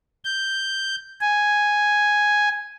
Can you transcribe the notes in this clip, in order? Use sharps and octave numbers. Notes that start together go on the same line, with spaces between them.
G6
G#5